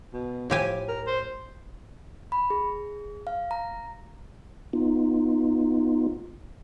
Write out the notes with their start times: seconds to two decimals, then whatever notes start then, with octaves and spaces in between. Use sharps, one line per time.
0.13 B2
0.50 A2 F3 G4 G#5
0.88 A#4
1.07 C5
2.32 B5
2.50 G#4
3.27 F5
3.51 A#5
4.73 B3 D#4 F4